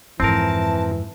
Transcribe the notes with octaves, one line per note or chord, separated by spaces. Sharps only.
F2 G#2 E3 C4 A#4 A5